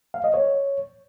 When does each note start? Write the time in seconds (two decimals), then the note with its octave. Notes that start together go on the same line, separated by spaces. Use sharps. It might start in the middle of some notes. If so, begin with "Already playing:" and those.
0.14 F5
0.24 D#5
0.34 C#5